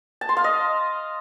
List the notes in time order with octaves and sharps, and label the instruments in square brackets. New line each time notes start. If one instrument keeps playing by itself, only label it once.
[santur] A5
C6
F5
D#5